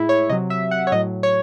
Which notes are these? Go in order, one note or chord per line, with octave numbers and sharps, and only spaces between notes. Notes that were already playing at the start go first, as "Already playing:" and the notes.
Already playing: A2 G#3 E4
C#5
C3 F#3 D#5
E5
F#5
C#5
A2 F#3 D#5
C#5